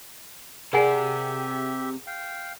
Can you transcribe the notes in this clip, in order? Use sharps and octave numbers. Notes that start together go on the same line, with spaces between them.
C3 G4 G#4 A#4 D5 E5 F#5 G#5
F5 G5